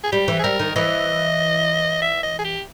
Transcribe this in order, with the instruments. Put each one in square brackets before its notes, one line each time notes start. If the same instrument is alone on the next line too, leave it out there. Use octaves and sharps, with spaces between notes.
[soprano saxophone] G#4
[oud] G3 [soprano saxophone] G4
[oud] E3
[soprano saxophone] G#4
[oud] G3 [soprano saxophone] A#4
[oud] D#3
[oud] E3 [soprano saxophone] D#5
[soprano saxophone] E5
D#5
G#4
G4